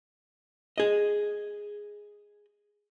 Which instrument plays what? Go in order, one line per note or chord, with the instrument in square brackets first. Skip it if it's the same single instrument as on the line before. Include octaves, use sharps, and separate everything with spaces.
[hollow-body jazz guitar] G#4 D#5